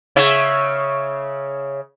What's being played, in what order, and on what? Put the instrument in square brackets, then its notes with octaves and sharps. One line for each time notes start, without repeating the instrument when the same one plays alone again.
[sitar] C#3 C#5 E5